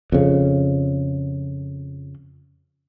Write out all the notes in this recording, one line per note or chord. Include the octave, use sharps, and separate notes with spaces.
F2 C#3